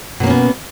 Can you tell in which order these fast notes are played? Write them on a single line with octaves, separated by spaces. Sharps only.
B2 A#3 C#4 B3